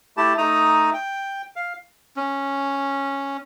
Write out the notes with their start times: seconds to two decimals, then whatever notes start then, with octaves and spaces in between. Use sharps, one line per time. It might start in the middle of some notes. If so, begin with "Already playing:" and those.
0.17 A3 E4 G4 A5
0.38 A3 D#4 A#5 D#6
0.94 G5
1.56 F5
2.16 C#4